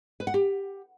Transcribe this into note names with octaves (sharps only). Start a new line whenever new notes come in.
B4
F#5
G4